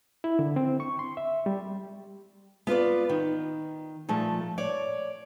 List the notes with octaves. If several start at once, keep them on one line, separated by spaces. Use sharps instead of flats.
E4
D3
C4
C#6
C6
E5
G3
B3 F4 B4 D5
D#3
A#2 F3 A3
C#5 D5